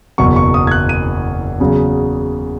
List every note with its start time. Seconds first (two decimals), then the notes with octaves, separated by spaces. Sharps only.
0.18 F#1 E2 B2 F#3 C#6
0.36 C#6
0.54 D#6
0.67 G#6
0.71 F#6
0.89 D#7
1.60 E2 C#3 F#3